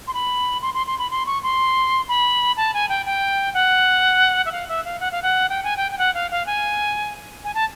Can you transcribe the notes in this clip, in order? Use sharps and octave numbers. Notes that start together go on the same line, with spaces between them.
C6
B5
C6
C6
C6
B5
C6
C#6
C6
B5
A5
G#5
G5
G5
F#5
E5
F5
E5
F5
F#5
F5
F#5
G5
G#5
G5
G5
F#5
F5
F5
G#5
G#5
A5